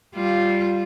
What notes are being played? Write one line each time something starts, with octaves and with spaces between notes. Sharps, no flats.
G3 F4